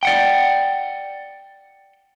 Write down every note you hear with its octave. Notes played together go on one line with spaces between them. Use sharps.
D5 F#5 G5